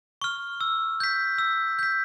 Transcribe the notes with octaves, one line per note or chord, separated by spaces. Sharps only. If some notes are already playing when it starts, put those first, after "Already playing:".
C#6 F6
E6
G6 B6
E6
G6 B6